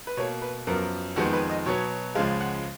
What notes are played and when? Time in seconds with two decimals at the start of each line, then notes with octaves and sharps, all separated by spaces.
0.07 B4
0.17 B2 A#3 C#5
0.42 B4
0.67 F#2 F3 B3 A#4
1.16 F2 D#3 G#3 B3 F#4
1.33 B4
1.49 D#5
1.66 B2 F#3 B3 C#5
2.15 C#2 C#3 F3 G#3 F5
2.41 F#5